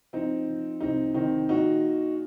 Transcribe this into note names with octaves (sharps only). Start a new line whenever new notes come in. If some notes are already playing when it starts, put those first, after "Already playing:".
F3 C4 D#4
F3
C2 C4 D#4
D#3 C4 D#4
A#2 D#4 F#4